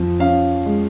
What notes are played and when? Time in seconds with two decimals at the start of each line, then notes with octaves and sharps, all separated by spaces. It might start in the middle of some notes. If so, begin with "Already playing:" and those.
Already playing: F2 F3
0.20 C#4 F5
0.66 G#3